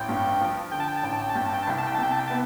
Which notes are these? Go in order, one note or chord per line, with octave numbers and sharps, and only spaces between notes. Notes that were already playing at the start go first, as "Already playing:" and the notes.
Already playing: A1 G5
G2
F3
D3 G5
A5
G5
A5
A1 G5
A5
G5
A5
G2 G5
A5
G5
A5
C2 G5
A5
G5
A5
C3 G5
A5
G5
B3 A5